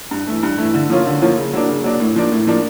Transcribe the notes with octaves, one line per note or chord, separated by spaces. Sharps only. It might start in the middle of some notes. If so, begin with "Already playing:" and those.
G2
E3 A3
G2
E3 A3
D3
F3 A#3 C#4 F4
D3
F3 A#3 C#4 F4
C#3
F#3 A#3 D4
C#3
F#3 A#3 D4
A2
F3 A#3 D4
A2
F3 A#3 D4